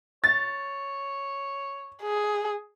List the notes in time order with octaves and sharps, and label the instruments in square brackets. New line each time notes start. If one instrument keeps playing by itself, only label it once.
[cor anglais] C#5 [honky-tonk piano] A6
[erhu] G#4